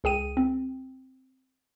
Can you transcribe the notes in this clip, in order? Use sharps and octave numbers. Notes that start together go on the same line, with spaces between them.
C#2 G#4 G5 D#7
C4